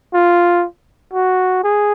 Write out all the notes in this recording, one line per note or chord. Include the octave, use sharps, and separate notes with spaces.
F4
F#4
G#4